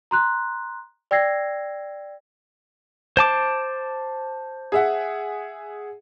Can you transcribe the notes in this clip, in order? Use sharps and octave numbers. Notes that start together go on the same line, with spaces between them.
A#5 C6 F#6
D5 G5 E6 G#6 A#6 C7
C5 A5 D6
G#4 E5 F#5